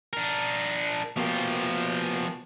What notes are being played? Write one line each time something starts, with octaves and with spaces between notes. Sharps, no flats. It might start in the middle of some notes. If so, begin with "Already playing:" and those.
D4 A#4
B2 F3 A#3 G4